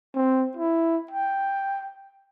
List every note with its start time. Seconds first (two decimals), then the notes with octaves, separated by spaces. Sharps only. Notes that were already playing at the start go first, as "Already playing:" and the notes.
0.15 C4
0.57 E4
1.11 G5